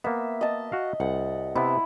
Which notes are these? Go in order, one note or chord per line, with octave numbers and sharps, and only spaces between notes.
A#3 B3 E5
D#5 A5
F#4 F5
C2 F#5
C3 B3 E4